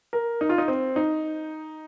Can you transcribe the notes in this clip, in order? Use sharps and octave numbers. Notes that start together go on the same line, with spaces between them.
A#4
D#4
F4
D#4
C4
D#4